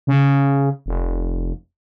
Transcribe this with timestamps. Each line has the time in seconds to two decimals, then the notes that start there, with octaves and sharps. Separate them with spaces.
0.07 C#3
0.86 F1